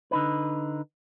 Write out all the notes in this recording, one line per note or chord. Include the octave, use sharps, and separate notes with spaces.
D3 D#4 B4